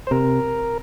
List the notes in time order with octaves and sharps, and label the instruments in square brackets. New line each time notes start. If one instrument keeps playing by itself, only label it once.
[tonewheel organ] C5
[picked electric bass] C3 [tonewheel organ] A#4